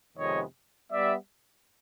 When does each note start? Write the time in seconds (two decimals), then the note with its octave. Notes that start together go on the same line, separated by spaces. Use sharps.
0.17 F2 C3 D#3 G#3 B3 C#5 D#5
0.91 G3 B3 D5 E5